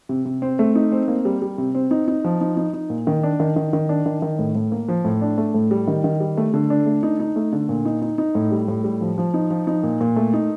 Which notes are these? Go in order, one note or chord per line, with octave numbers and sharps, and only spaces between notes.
C3
C3
C4
A3
D#4
C4
A#3
G3
G3
C3
C4
D#4
D#4
F3
D#4
D#4
D#4
A#2
D#3
D4
D#3
D#3
D#3
D4
D#3
D#3
A2
A2
A#3
F3
A2
D4
A3
A2
G3
D#3
D#3
G3
A3
D3
D4
A3
D#4
D#4
A3
D3
A#2
D#4
D#4
D#4
A2
G3
A2
G3
F3
F3
D#4
F3
D#4
A#2
A#2
A3
D#4